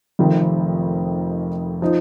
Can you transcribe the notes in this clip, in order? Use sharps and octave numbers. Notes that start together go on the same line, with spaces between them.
F1 F2 D#3 C4
F3 D#4